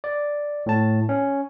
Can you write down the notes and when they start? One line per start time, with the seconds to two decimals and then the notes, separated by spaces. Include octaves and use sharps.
0.04 D5
0.66 A2 A5
1.09 C#4